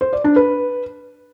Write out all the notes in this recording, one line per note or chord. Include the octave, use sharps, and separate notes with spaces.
C5
D5
D4
B4